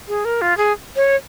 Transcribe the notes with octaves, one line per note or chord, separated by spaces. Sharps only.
G#4
A#4
F4
G#4
C#5